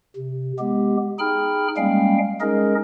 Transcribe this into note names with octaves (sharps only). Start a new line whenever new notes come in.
C3
G#3 B3 G4
D#4 G#4 G5 B5 F6
G3 G#3 A#3 C#4 F5 G5
G#3 C#4 D#4 G#4 A#4 D#5